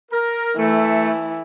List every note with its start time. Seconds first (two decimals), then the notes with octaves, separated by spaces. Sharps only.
0.11 A#4
0.57 E3 A3